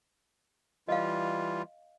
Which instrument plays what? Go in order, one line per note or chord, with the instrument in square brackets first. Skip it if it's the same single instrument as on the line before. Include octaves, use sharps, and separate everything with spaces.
[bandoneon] E3 G3 F4 [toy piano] D#5 F5